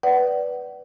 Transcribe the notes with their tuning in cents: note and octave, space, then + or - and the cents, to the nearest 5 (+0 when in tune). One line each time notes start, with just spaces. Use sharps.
B4 +0 D5 -5 F#5 +30